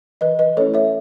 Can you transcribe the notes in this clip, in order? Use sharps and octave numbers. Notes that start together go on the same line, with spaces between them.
E3 B4 D#5
B4 D#5
A3 C#4 E4 A4 C#5
C#5 E5